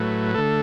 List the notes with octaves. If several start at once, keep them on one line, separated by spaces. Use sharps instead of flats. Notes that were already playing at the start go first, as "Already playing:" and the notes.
Already playing: A2 F#3 A3 B4
D3 A3 A4